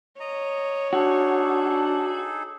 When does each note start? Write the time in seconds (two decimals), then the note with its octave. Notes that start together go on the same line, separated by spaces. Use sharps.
0.20 C#5 D#5 A#5
0.93 D4 D#4 F#4 G#4 A4